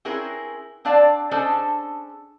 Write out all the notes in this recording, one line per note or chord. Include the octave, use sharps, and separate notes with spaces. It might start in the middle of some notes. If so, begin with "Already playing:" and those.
C4 C#4 E4 G#4 A#4 B4
C4 D4 D5 F5 G5 A5
C#4 D4 G#4 A4 C5 D#5